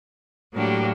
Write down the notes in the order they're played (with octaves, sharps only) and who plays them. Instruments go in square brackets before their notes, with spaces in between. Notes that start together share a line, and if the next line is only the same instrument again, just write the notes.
[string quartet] A2 F#3 A#3 D4 G4